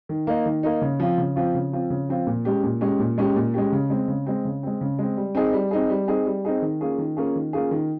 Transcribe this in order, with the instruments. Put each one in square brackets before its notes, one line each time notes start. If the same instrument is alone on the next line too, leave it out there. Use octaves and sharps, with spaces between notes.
[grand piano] D#3
A#3 D#4
D#3
A#3 D#4
C#3
F3 C4 F4
C#3
F3 C4 F4
C#3
F3 C4 F4
C#3
F3 C4 F4
A#2
G#3 C#4 G4
A#2
G#3 C#4 G4
A#2
G#3 C#4 G4
A#2
G#3 C#4 G4
C#3
G#3 C4
C#3
G#3 C4
C#3
G#3 C4
C#3
G#3 C4
G3
C4 D#4 G#4
G3
C4 D#4 G#4
G3
C4 D#4 G#4
G3
C4 D#4 G#4
D#3
A#3 C#4 F4 G#4
D#3
A#3 C#4 F4 G#4
D#3
A#3 C#4 F4 G#4
D#3